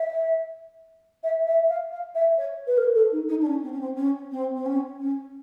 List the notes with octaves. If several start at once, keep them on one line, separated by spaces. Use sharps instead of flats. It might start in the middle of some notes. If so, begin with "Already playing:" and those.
Already playing: E5
E5
E5
F5
F5
E5
C#5
B4
A#4
A4
D#4
D#4
D4
C#4
C4
C#4
C4
C#4
C4
C4
C#4
C#4